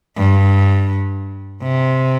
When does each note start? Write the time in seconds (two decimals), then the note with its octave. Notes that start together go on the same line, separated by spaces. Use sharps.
0.18 G2
1.63 C3